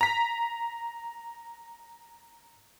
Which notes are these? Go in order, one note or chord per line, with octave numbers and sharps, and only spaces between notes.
A#5 B6